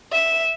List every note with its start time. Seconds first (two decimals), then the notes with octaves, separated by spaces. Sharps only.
0.12 E5